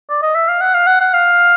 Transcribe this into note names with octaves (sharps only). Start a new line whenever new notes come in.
D5
D#5
E5
F5
F#5
F5
F#5
F#5
F5